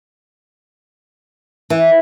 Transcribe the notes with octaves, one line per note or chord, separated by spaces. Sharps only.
E3